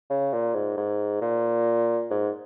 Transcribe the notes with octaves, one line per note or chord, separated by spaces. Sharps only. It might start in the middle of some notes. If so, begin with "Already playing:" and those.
C#3
A#2
G#2
G#2
A#2
G#2